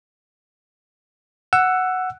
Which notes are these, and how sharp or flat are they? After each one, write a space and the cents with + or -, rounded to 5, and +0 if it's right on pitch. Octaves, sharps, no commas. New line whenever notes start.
F#5 +0 E6 +15